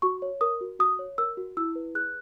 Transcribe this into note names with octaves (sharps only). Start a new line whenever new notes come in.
F#4 C#6
C#5
A#4 D#6
F#4
F#4 D#6
C#5
A#4 E6
F#4
E4 E6
B4
G#4 F#6